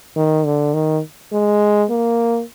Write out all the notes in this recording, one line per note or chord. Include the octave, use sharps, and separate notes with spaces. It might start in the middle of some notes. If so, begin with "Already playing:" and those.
D#3
D3
D#3
G#3
A#3